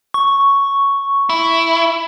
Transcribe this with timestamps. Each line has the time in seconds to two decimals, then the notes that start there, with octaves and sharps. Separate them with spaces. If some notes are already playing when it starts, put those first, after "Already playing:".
0.14 C#6
1.30 E4